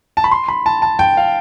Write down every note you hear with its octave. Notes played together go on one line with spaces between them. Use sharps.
A5
B5
C6
B5
A5
A5
G5
F5